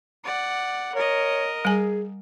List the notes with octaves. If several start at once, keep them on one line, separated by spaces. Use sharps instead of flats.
D5 F#5
A#4 C#5 D#5
G3 G#4 G#5